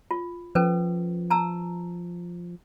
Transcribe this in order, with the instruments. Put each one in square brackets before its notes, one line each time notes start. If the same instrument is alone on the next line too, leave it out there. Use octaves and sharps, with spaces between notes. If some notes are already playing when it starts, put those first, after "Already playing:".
[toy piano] F4
[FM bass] F3 [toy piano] C#4 A4 B4
[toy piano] A5 A#5 E6